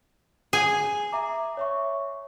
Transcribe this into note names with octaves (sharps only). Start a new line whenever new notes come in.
G#4 G#5
E5 A#5 D6
C#5 E5 C#6